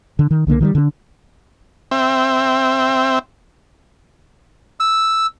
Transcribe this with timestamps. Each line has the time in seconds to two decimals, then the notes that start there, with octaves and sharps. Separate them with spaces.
0.19 D3
0.31 D#3
0.47 C2 D3 G#3 A#3
0.61 D#3 F#3 G3
0.75 D3 D4
1.91 C4 E5 G5
4.80 E6